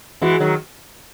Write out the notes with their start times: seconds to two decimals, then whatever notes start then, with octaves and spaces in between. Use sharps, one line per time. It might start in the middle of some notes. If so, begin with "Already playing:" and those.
0.22 E3 G#3 F#4
0.40 D#3 F#3